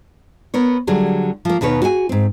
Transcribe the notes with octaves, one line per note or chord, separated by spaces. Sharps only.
B3 A#4 C#5
D3 F#3 G3 G#4
F3 A#3
D#2 B2 D#3 B4 C#5
F#4 G#4 F5 G#5
G#2 C4